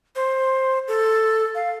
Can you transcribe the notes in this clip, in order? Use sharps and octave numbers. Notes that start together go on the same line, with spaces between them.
C5
A4
F5